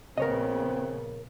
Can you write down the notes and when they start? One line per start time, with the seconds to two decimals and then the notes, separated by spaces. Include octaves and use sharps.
0.18 A#1 C#3 B3 C4 A#4 C#5 D#5